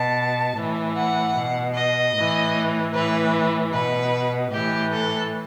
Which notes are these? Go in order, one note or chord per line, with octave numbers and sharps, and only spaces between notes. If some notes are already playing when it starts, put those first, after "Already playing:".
Already playing: B2 A5
A2 E3
F#5
B2
D#5
A2 E3
A2 E3 B4
B2 B4
A2 E3 G4
A4